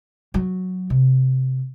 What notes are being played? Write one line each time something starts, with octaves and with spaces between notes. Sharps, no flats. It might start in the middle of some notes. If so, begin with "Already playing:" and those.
F#3
C3